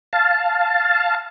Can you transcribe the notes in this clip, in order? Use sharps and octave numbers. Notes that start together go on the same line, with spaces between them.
F5 A5